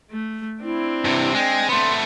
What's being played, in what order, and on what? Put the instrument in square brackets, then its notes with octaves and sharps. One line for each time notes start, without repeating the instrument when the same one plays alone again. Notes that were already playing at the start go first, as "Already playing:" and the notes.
[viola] A3
[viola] C4 D4 [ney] E4
[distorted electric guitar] G2 C3
[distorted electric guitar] G#3 [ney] G5
[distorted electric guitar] A3 B3 [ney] C6